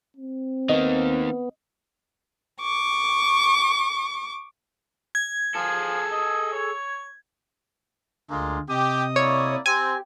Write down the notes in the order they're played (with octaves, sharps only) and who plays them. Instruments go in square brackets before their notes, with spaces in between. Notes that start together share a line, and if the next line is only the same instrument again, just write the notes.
[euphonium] C4
[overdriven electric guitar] D#3 A#3 [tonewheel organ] B3 [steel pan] D#5
[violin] C#6 D6
[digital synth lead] G#6
[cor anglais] F3 [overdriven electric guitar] G#4 A4
[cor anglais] D#5
C#5
[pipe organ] D2 D3 [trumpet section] G#3 A#3 F4
[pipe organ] C3 D#5 D#6 [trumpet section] G4
[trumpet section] A#3 E4 D5 [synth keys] C#5
[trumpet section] C4 [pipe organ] G4 [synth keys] G#5